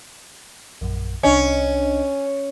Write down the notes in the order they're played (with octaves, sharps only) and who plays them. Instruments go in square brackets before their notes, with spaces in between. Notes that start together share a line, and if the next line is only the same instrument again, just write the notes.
[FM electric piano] A#1 F#2
[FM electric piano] C2 D4 D#5 [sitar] C#4